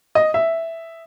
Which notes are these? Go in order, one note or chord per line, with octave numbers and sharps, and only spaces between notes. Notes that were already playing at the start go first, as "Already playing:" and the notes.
D#5
E5